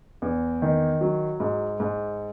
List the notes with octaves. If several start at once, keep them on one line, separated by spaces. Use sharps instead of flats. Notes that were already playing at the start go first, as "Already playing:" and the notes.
E2
D#3
F#3
G#2
G#2